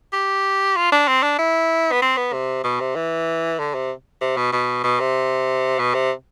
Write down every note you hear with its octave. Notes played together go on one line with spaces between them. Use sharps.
G4
F4
D4
C4
D4
E4
B3
C4
B3
C3
B2
C3
E3
D3
C3
C3
B2
B2
B2
C3
B2
C3